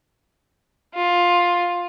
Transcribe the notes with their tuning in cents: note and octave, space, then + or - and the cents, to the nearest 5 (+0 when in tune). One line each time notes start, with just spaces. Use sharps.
F4 +10